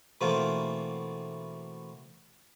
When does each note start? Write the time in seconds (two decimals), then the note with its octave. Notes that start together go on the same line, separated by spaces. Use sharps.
0.21 B2 E3 A3 A#3 C4 F4